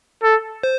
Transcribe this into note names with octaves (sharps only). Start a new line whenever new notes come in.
A4
C5